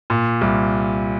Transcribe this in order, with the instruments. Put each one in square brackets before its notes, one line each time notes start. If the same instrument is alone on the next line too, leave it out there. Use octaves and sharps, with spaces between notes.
[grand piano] A#2
C2